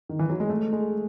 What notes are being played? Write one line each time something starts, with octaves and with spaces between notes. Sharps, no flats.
D#3
E3
F#3
G#3
A3
G#3